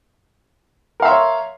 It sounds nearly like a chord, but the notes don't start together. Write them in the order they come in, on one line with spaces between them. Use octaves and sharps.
A#4 F5 E5 C6 C#5